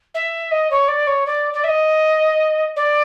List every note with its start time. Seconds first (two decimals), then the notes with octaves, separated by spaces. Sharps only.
0.14 E5
0.51 D#5
0.71 C#5
0.88 D5
1.07 C#5
1.26 D5
1.53 D5
1.64 E5
1.68 D#5
2.76 D5